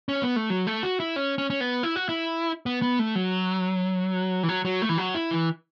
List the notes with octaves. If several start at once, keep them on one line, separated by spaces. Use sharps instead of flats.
C#4
B3
A3
F#3
A3
F#4
E4
C#4
C#4
C#4
B3
E4
F#4
E4
B3
B3
A3
F#3
E3
F#3
F#3
A3
E3
F#3
E4
E3